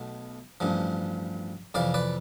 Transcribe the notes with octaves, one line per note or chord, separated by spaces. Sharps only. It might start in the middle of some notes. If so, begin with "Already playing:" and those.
Already playing: B1 B2 A3
A1 G2 F3
F2 C3 E3 D5 F5
B4 D5